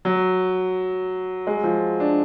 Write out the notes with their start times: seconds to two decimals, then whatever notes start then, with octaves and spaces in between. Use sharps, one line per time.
0.05 F#3
1.47 G#3
1.64 F3
2.00 D4